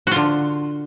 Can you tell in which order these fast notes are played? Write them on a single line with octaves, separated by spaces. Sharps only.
F#4 F4 D3